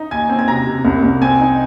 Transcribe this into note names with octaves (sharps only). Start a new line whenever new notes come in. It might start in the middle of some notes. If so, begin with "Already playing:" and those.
Already playing: D#4
D#2 G#5 G#6
C4
G#6
C3 A#5 A#6
C3
C2
C2
C4 G#5 G#6
D#4